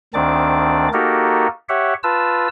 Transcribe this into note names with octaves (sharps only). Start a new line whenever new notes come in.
D2 D#3 C4 D4 D5 D6
A#3 D#4 F#4 G4 A4 A#4
G4 C#5 E5 F#5
F4 B4 A5 E6